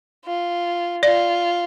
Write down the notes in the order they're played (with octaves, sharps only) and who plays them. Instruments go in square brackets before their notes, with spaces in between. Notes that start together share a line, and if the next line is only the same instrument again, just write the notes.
[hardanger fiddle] F4
[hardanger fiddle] F4 [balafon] D5